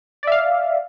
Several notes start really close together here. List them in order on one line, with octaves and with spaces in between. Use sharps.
D5 E5 F5